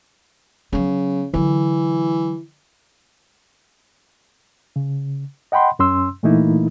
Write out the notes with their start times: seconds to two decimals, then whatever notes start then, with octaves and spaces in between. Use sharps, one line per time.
0.73 C#3 F#3 B3
1.34 D3 E3 F#3
4.76 C#3
5.52 D#5 F#5 G5 B5 C6
5.79 F#2 C#4 C6 E6
6.23 A#2 E3 A3 A#3 D#4 E4